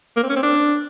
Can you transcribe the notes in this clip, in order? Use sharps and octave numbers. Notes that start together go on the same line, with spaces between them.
A#3
C4
C#4
C4
D4